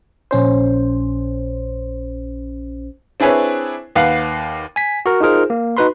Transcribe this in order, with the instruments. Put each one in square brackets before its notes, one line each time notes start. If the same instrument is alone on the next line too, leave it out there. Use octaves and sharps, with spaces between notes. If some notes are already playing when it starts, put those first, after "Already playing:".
[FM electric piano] A#1 C#4 C5
[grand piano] C4 D4 E4 G#4 B4 C#5
D#2 B4 F5 F#5 C7
[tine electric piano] G#5 B6
F#4 A#4
D#4 F4 G#4 A#4 C5
A#3
D#4 F#4 B4 B5 C6